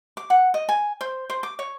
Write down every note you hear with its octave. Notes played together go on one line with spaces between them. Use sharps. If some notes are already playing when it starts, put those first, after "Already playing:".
D6
F#5
D#5
G#5
C5
C5
D6
C#5